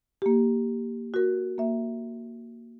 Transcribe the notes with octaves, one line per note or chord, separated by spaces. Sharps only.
A#3 G4
F#4 A#4
A#3 E5